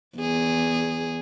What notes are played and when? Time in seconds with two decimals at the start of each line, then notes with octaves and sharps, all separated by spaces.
0.18 E2 G#4